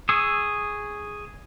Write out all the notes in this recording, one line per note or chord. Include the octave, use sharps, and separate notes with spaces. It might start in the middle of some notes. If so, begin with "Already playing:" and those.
G#4 C#6 D#6 E6